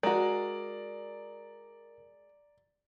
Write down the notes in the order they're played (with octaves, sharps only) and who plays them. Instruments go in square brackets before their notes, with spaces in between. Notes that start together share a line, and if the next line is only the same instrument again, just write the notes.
[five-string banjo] G#3 F#4 [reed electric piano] A#4 [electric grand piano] D5 A#5